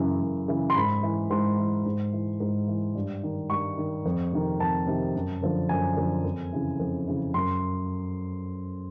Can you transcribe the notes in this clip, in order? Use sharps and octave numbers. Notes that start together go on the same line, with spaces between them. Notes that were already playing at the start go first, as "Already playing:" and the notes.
Already playing: F#2 C#3 E3
F#2
C#3 E3
C6
G#2 B5
E3
G#2 C6
E3
G#2
E3
G#2
E3
G2
D#3
G2 C#6
D#3
F2
C3 D#3
F2 A5
C3 D#3
F#2
D3 F3
F#2 G#5
D3 F3
F2
C#3 E3
F2
C#3 E3
F#2 C6